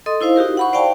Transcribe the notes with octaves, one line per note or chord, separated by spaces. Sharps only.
A4 D#5 C6 D#6
D#4 E4 C5 F5
D#4 F#4 G4 A#4
F#5 B5 C#6
C5 D5 F5 G5 A5